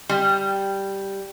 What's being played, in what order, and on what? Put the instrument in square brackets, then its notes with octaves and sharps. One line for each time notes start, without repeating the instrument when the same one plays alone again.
[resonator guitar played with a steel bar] G3